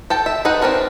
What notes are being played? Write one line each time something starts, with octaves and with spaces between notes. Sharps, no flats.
A4 G5 A5
E5
D#4 G#4 B4 C5 F#5
C4 D4 F#4 A#4 C#5